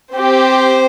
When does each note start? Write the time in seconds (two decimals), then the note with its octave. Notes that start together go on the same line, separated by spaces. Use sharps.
0.13 C4 G4 C5